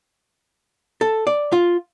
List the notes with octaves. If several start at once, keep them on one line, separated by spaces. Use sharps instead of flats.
A4
D5
F4